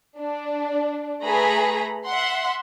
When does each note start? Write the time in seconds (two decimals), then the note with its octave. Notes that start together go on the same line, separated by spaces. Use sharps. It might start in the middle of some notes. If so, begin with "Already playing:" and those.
0.18 D4
1.24 A3 G#4 B4 A#5 B5
2.06 E5 F#5 C6